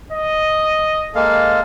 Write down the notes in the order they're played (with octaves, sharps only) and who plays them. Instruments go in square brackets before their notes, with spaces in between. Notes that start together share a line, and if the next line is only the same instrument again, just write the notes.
[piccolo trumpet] D#5
[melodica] G#3 A#3 F5 [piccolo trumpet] A4